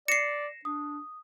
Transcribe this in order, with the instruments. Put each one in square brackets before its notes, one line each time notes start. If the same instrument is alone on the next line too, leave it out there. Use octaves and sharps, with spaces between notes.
[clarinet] D5 [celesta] A#6 E7 [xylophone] C7 C#7
[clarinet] D4 [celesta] D#6